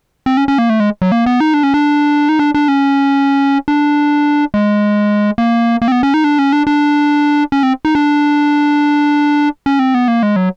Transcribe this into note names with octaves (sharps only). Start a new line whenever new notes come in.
C4
C#4
C#4
A#3
A3
G#3
F#3
A#3
B3
D#4
D4
C#4
D4
D#4
D4
D4
C#4
D4
G#3
A#3
A#3
C4
B3
C#4
D#4
D4
C#4
D4
D4
C#4
C4
D#4
D4
C#4
C4
B3
A#3
G#3
F#3